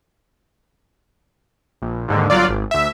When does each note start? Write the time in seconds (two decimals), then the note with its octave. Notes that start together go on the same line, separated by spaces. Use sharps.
1.82 A#1
2.08 D#2 G#2 D3
2.30 G1 F#3 F4 D5
2.49 G#1
2.71 D2 E5